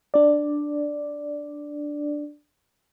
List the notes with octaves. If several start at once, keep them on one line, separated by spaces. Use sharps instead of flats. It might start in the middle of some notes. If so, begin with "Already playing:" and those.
D4 D5